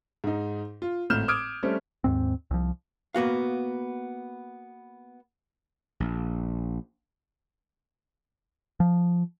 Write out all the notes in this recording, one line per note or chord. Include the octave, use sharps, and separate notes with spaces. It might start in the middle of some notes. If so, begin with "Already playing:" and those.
G#2 D#4
F4
G#1 A2 F6 G6 E7
D6 D#6 F6 G#6 D7
G3 A3 C4 C#4
D#2 G#2 C4
C2 F3
A#3 B3 F#4 F5
A#1
F3